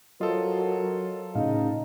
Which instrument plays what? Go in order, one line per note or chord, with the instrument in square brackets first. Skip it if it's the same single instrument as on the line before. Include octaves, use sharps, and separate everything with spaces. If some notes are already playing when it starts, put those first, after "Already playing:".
[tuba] F#3 [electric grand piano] F4 A4 C5 [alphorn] A#4 [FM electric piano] D#5
[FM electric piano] A2 F5 [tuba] C#3 [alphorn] D#4